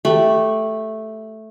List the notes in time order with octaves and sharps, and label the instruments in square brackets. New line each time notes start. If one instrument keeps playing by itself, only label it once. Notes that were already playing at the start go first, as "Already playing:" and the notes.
[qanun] A3 G4 B5